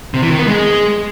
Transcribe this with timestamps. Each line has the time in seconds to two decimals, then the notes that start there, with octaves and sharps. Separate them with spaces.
0.14 C3
0.22 E3
0.31 D#3
0.39 B3
0.47 G#3